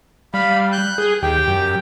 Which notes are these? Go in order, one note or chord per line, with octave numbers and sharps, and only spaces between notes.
G3 F5 B5
F#6 G6
G#4
D#2 G4 G5
F#2